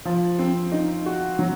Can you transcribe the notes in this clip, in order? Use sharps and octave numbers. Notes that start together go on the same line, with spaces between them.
F3
C4
D#4
F#4
F#3